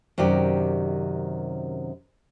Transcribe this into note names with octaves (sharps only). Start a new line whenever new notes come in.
F#2 C3 D#3 G4 D5